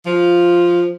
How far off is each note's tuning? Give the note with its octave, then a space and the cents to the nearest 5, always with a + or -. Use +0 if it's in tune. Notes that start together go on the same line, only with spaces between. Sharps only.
F3 +0